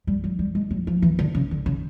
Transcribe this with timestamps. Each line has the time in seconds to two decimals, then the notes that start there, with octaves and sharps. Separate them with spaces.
0.07 G3
0.24 F#3
0.39 G3
0.55 G#3
0.71 F#3
0.87 F3
1.02 E3
1.19 D3
1.35 C#3
1.51 D3
1.66 C#3